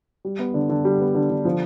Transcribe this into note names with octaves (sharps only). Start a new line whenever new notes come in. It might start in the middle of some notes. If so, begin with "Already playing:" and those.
G3
B3
D3
D3
G3
B3
D3
D3
F3